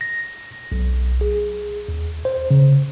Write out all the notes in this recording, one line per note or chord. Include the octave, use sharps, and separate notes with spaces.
A#6
B1
G#4
D#2
C5
C#3